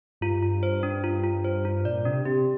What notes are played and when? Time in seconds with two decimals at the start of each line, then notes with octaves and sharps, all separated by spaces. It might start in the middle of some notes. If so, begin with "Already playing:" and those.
0.21 G2 F4
0.43 F4
0.63 C5
0.83 D4
1.04 F4
1.24 F4
1.44 C5
1.65 F4
1.85 A#2 D5
2.05 C3 D4
2.25 C3 G4